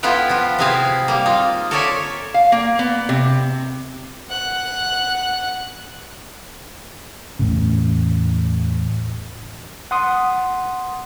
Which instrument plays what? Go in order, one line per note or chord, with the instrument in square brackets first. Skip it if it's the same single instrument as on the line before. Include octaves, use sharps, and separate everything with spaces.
[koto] B3 E4 F4 A4 B4 G5
F3 F4 B4
C3 C4 E4 G#4 B4 F5
G3 A#3
D#4 F4
A4 A#4 C#5 D5 E5 G#5
[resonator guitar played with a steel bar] F5
A#3
B3
C3
[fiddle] F#5 F#6
[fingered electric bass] E2 A2 C#3
[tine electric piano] F#5 C6 D#6